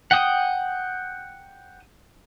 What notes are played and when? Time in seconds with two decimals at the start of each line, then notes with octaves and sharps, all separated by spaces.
0.11 F#5 G5 D#6